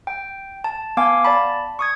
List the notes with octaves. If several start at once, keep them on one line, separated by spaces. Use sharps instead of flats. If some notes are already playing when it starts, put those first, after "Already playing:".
G5
A5
B3 F5 G#5 D6
D5 A5 B5
C#6 D#6 G#6